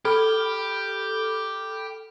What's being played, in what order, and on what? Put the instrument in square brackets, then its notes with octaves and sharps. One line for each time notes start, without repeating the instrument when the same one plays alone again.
[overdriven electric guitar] G4 [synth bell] A4 B5 F6